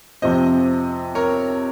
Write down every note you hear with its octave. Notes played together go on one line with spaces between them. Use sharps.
F2 C3 F3 C4 C5 D#5
A#4 C#5